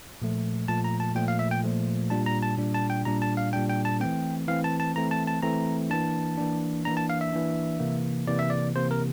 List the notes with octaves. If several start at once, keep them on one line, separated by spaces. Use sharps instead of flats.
A#2 F3 A3
A#2 F3 A3 A5
A#5
A5
A#2 F3 A3 G5
F5
E5
G5
A#2 F3 A3
A#2 G3 D4 A5
A#5
A5
A#2 G3 D4
A5
G5
A#2 G3 D4 A#5
A5
F5
A#2 G3 D4 G5
G5
A5
E3 A3 C4 G5
E3 A3 C4 F5
A5
A5
E3 A3 C4 A#5
A5
A5
E3 A3 C4 A#5
E3 A#3 D4 A5
E3 A#3 D4
E3 A#3 D4 A#5
A5
F5
E5
E3 A#3 D4
C3 E3 A#3
C3 E3 A#3 D5
E5
D5
C3 E3 A#3 C5
A#4